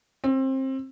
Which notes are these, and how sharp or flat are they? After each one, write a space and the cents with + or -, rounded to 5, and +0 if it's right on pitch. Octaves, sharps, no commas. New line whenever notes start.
C4 +25